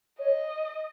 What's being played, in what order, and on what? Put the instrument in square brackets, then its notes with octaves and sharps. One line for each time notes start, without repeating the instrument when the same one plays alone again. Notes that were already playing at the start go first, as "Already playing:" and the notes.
[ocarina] C#5 [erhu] D#5